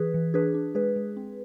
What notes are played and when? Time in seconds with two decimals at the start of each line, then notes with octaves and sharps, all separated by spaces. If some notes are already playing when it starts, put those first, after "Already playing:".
Already playing: E3 G#4 B4
0.14 E3
0.34 D4 G#4 B4
0.54 D4
0.75 G#3 G#4 B4
0.96 G#3
1.16 C4